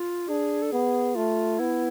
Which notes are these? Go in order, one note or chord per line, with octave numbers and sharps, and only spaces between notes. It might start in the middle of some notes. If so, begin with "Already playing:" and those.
Already playing: F4
D4 G#4
A4
B3 G#4
A3 F4
B3 E4